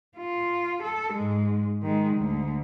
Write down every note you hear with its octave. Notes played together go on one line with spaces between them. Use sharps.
F4
A4
G#2 G#3
D#3 G#3
D2